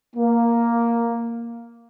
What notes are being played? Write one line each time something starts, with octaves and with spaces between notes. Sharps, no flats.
A#3